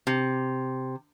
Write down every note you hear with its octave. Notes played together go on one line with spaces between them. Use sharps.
C3